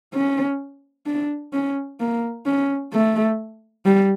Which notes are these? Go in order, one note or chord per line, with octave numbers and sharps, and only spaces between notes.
C#4
D4
C#4
A#3
C#4
A3
G3